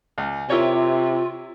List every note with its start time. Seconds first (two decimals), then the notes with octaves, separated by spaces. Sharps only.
0.18 C#2
0.50 C3 E4 F4 A#4 C#5